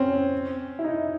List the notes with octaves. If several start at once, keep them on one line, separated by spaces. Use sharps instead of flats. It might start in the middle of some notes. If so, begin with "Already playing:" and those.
Already playing: C4 C#4
E4
D#4